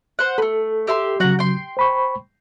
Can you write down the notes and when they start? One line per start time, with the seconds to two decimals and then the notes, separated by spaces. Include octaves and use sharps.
0.19 C5 F#5
0.38 A3 B3 A4
0.87 G4 E5 C6
1.20 C#3 F#3 F#4 F#5 A#5
1.39 G5 C6
1.77 C5 B5 C#6